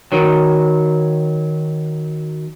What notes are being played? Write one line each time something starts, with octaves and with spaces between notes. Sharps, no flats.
D#3 F#3